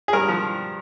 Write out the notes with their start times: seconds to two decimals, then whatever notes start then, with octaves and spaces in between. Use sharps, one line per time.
0.08 G#4
0.13 G2 A#4
0.28 F3